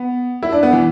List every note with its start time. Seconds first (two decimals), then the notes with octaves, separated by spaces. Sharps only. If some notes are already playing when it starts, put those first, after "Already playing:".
Already playing: B3
0.43 E4
0.52 D4
0.63 B3
0.73 E3